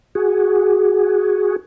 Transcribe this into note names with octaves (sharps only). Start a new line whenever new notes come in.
F#4 G#4